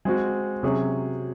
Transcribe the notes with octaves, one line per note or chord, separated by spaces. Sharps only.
G#3 C4 F#4
C3 F#3 C#4 G#4